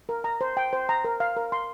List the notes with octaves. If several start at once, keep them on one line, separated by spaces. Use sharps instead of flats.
A#4
A#5
C5
G5
C5
A#5
A#4
F5
A#4
C6